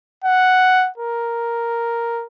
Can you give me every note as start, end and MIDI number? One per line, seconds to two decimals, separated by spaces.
0.24 0.89 78
0.98 2.25 70